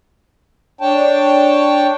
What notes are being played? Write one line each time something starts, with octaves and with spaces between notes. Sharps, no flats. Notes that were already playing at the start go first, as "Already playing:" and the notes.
D4 C#5 G5 A5